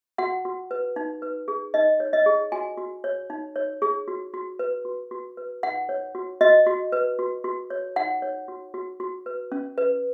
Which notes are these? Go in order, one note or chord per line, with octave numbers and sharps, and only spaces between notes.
F#4 F#5
F#4
B4
D#4
B4
G#4
D#4 D#5
C#5
D#5
G#4
F#4 G#5
F#4
C#5
D#4
C#5
G#4
F#4
F#4
B4
F#4
F#4
B4
D#4 F#5
C#5
F#4
F#4 D#5
F#4
B4
F#4
F#4
C#5
D#4 F#5
C#5
F#4
F#4
F#4
B4
C#4
B4